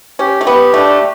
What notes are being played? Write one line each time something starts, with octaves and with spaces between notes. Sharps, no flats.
C#4 G4
A3
B3 G4
A3 D4